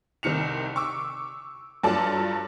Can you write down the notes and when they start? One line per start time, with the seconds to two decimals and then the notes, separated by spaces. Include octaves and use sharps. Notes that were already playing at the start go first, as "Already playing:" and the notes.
0.23 C2 C3 D#3 C#7 F7
0.76 C#6 D6 E6
1.83 G2 F#3 F4 A4 D5 A5